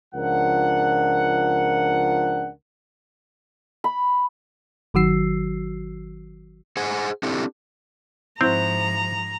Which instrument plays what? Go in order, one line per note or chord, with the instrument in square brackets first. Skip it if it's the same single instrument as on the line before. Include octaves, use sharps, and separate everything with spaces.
[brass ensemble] C#2 F3 D4 A#4 F#5
[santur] B5
[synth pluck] G1 D#3 F#3 F#4 E6 C7
[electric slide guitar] G#4 C5 F#5 G#5
C4 D4 E4 G4 A4
[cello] G#2 F3 [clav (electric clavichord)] C4 [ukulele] E4 F#4 C5 [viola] A#5